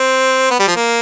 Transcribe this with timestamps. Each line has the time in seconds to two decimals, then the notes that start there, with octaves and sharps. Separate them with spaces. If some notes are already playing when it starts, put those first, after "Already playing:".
Already playing: C4
0.50 B3
0.60 G3
0.67 F3
0.76 A#3